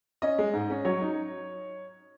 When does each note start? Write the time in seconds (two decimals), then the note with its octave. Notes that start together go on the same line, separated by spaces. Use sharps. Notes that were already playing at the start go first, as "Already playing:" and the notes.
0.22 C#4 D#5
0.38 G#3
0.53 G#2
0.70 C#4
0.85 F#3 C#5
1.01 D#4